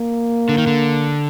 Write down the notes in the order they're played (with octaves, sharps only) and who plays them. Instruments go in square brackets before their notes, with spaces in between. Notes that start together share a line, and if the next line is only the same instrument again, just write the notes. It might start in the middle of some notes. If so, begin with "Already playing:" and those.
Already playing: [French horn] A#3
[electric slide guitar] D3
D#3
D3